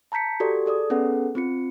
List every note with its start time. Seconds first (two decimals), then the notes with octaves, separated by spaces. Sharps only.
0.12 A5 A#5 G6 B6 C#7
0.40 F#4 G4 A4 D5
0.66 G#4 A4 D5 D#6
0.90 B3 C#4 G#4 A4 B4 F#5
1.35 C4 F4 C#7